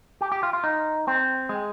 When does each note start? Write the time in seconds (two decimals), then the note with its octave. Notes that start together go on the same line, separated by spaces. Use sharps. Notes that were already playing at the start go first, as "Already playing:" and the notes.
0.21 G4
0.32 G4
0.43 F4
0.53 F4
0.64 D#4
1.08 C4
1.49 G#3